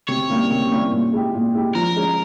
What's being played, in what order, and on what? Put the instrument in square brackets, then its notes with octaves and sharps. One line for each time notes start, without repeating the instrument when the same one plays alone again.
[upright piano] C3 [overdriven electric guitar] C#5
[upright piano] G3 A#3 C#4 E4
C3
G3 A#3 C#4 E4
A#2
G#3 E4 G4
A#2
G#3 E4 G4
[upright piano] F3 [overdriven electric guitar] A#4
[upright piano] G#3 C#4